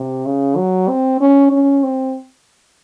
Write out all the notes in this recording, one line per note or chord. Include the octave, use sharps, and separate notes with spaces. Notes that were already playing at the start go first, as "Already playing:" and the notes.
Already playing: C3
C#3
F#3
C4
C#4
C#4
C4